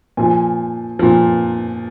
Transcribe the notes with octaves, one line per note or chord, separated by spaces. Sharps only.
A#2 F3 G#5
A#2 F3